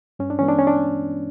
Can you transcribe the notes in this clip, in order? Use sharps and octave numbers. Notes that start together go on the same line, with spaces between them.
G2 C#4
D4
E3 G#3 B3 C#4
D4
C#4
D4